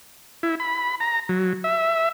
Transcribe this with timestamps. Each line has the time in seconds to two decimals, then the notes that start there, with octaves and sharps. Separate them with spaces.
0.43 E4
0.60 B5
1.00 A#5
1.29 F#3
1.64 E5